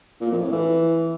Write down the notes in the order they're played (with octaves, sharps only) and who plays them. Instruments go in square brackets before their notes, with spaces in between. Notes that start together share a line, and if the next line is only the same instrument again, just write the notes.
[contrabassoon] A#2
F2
A2
E3